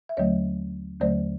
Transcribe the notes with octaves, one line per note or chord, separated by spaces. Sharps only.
E5
D#2 D3 F#3 A3 C#5 D#5
D#2 D3 F#3 A3 C5 D5